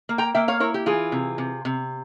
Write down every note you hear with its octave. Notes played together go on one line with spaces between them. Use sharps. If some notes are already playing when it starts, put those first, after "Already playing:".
A#3
G5 A#5
A#3 E5 G5
C#5 F5
E4 A#4 C#5
G4
E3 F4 G#4
C3
C3
C3